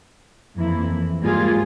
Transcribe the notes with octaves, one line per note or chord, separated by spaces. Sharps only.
F2 E3 A#3 E4
G#2 G3 A#3 F4 G#4